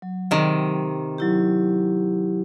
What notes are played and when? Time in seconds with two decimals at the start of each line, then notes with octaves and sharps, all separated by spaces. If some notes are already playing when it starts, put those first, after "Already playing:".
0.02 F#3
0.31 C3 D#3
1.18 F#3 E4 G4